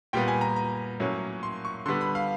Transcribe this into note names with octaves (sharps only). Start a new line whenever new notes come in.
A#2 G3 B3 G5
G#5
A#5
A#5
A2 F#3 A#3 C#4
C6
C#6
D3 G3 B3 C6
B5
F5